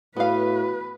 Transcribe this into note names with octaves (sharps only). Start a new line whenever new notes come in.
A2 B3 F#4 B4 F5